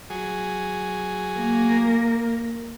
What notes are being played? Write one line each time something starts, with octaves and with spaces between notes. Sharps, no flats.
F#3 G#4
A#3 A#4